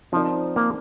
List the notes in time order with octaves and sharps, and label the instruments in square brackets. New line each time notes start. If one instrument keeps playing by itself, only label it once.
[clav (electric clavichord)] F3 [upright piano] C4 D#4 A#4 D5
[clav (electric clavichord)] A#3